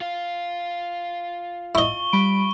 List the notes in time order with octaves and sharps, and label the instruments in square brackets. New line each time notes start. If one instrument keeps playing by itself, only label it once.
[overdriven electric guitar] F4 F5
[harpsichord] E4 D#5 [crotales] C#6 G7
[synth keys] G3 B5 D7